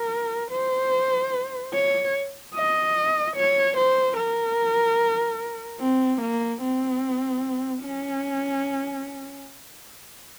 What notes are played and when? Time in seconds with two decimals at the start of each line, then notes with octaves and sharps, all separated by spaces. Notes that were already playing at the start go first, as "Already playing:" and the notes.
Already playing: A#4
0.51 C5
1.74 C#5
2.55 D#5
3.36 C#5
3.77 C5
4.17 A#4
5.80 C4
6.21 A#3
6.62 C4
7.83 C#4